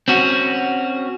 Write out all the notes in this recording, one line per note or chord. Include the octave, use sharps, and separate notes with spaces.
C4 C#4 F#4